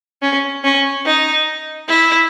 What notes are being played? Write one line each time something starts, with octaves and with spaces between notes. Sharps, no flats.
C#4
C#4
D#4
E4